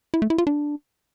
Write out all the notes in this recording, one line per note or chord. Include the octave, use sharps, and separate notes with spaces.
E4
A3
E4
F4
D4